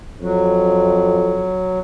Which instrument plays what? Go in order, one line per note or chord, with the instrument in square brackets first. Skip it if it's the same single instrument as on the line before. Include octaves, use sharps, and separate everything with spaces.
[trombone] F2 [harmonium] F#3